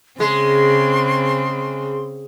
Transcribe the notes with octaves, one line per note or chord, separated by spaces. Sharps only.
C#3 G#3 C4 G#4 C6